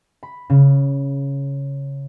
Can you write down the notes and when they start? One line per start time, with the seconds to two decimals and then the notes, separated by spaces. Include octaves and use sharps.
0.23 B5
0.50 C#3